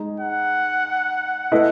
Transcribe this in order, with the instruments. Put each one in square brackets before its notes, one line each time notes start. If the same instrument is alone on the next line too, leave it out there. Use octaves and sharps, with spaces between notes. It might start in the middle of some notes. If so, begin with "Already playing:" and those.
Already playing: [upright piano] G#3 D#4 G#4
[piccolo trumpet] F#5
[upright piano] A3 E4 B4 D#5